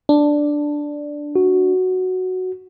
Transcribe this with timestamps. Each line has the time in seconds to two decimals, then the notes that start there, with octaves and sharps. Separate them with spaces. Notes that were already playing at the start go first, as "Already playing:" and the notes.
0.09 D4
1.36 F#4